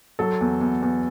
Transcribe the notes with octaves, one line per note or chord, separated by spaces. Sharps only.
F#3 A4
E2
E2
E2